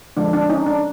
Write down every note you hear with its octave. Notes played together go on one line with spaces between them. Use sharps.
D3 F3 G#3 D4
D4
C#4 D#4
D4